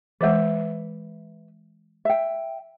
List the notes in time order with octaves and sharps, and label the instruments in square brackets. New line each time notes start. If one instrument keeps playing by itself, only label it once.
[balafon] E3 G#3 [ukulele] B4 E5
[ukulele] E5 G5